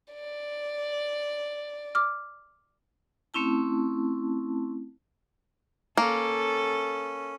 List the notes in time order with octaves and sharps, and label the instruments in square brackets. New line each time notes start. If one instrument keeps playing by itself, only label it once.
[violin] D5
[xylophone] D6 F6
[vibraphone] A3 C4 C#4 E4 A5
[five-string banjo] A#3 [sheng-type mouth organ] C#4 [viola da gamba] A4